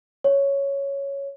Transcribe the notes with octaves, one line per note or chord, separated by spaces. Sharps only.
C#5